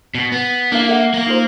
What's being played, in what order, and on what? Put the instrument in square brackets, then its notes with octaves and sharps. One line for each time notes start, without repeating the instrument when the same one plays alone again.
[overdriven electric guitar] B2
B3
[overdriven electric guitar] A#3 [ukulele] D4 E4 F5
[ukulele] A#4 E5 F#5
[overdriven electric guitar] A#3 F5
[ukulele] D#4 F4 C5